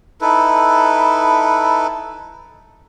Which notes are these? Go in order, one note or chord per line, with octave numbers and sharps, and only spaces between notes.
D#4 E4 A4 B4